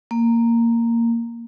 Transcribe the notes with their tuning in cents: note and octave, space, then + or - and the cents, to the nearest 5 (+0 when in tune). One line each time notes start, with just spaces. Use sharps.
A#3 -10